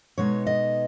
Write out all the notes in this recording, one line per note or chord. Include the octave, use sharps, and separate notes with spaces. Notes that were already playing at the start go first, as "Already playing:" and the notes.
B2 G#3 B3 D#4 C#5
D#5